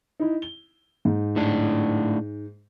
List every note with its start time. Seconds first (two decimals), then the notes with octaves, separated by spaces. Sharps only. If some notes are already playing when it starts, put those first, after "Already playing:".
0.20 D#4 E4
0.42 G7
1.05 G#2
1.36 A2 D4